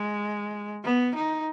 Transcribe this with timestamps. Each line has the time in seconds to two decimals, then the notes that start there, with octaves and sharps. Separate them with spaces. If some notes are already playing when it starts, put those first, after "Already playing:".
Already playing: G#3
0.84 B3
1.15 D#4